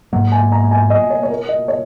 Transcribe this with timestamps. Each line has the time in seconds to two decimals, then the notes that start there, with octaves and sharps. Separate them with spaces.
0.13 G#2 F#3 A#3 F#5
0.32 G#5
0.52 A#5
0.71 G#5
0.90 D#5
1.10 C#5
1.23 C#5
1.30 A#4
1.49 D#5
1.68 C#5